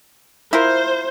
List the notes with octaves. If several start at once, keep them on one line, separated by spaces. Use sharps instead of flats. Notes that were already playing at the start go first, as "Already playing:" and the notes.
E4 F4 A#4 C5